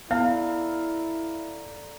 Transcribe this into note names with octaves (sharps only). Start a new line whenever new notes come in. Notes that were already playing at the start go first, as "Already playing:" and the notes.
B3 E4 A4 D5 F5 A#5